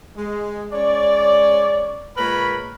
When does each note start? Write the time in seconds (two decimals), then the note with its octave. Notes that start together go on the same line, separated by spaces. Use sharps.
0.17 G#3
0.73 G#3 C#4 C#5 D5
2.17 A#2 G#3 A#4 B4 C#5 B5